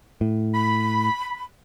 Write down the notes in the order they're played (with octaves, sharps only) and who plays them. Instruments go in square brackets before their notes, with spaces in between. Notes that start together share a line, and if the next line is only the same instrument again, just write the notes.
[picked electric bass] A2
[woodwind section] B5